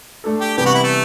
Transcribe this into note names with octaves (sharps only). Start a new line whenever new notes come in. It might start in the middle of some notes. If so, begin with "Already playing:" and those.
A3 D4 A4
G4
C3 E3 G3 B3 G4
F#4
E4
A3